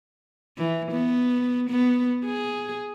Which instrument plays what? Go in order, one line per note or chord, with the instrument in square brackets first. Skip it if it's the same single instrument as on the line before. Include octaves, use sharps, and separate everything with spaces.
[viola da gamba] E3
B3
B3
G#4